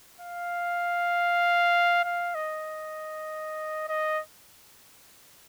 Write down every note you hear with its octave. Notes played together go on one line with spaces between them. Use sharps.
F5
F5
D#5
D#5